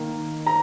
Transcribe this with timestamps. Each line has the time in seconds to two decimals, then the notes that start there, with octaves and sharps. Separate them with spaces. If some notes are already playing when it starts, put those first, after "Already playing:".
Already playing: D#3 A#3
0.46 A#5